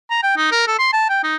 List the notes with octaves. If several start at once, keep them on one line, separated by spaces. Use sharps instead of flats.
A#5
G5
D#4
A#4
A4
C6
A5
G5
D#4